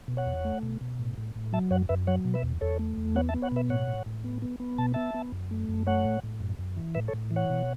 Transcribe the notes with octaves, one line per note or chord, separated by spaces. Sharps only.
B2
C#5 F#5
E2
A3
B2
B2
A2
A2
A2
F#3 E5 A5
F#2 C#5 F#5
F#2 B4 E5
F#3 C#5 F#5
B2
B4 E5
E2
E2 A4 C#5
A3
E2
B3 C#5 F#5
E5 A5
B3
C#5 F#5
B2 B4 E5
A2 C#5 F#5
A2
A2
B3
B3
B3
B2 A5
B3 E5 A5
B3
F#2
A3
F#2
A3 C#5 F#5
A2
A2
F#2
F#2
E3
A2 B4 E5
A4 C#5
A2
E3
C#5 F#5
B2